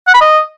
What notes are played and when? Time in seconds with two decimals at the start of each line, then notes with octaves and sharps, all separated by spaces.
0.07 F#5
0.14 B5
0.21 D#5